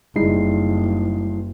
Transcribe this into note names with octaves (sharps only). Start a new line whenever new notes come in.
F#1 G3 G#3 D#4 E4 C7